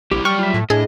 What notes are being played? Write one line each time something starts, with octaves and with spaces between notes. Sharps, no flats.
A#1 G3 E4 G4
F#3 G3 G5 C#6 F6
F4 E5
A2
A2 D4 G#4 D#5